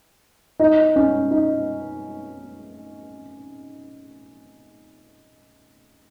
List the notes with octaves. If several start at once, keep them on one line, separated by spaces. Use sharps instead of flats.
D#4
C#4
D#4